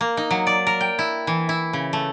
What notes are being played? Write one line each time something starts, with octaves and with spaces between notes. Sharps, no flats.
A#3
D#4
F#3
D5
A#4
G5
E4
E3
E4
C#3
A3